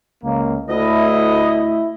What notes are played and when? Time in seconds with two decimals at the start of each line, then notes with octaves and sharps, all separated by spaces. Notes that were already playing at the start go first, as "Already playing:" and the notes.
0.23 C#2 A#3
0.68 D2 A3 E4 D#5